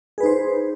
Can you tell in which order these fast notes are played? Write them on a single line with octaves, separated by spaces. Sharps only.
G#4 B4 D#4 C5